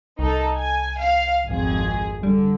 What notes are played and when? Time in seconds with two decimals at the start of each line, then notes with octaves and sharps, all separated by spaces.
0.19 C2 D#4 A4
0.56 G#5
0.98 F5
1.46 G#1 F2 G#4
2.23 D3 G3